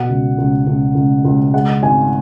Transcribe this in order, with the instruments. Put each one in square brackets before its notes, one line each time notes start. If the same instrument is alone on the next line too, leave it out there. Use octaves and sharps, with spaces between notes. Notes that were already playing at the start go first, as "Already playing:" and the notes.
Already playing: [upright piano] B2 F#5
C#2
C#2
C#2
C#2
C#2
G#3 F#5
G#1 G#5